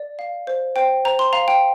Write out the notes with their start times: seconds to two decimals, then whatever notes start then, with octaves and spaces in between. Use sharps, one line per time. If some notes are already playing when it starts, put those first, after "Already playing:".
Already playing: D5
0.19 F5
0.47 C5
0.76 C5 G5
1.05 C5 A#5
1.19 C6
1.33 F5 A#5
1.48 G5